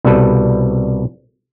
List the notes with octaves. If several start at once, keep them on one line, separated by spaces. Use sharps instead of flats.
C2 B2 G3 A4 B4